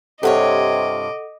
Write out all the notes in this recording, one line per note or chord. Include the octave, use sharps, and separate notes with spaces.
G2 C3 F4 A4 C#5 D#5 F#5 D6